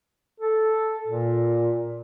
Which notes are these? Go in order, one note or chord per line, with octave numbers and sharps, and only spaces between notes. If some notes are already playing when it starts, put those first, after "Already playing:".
A4
A#2